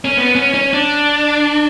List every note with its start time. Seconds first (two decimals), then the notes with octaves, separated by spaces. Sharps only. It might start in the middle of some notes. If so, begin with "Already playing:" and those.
0.05 C#4
0.17 B3
0.35 C#4
0.54 C#4
0.73 D4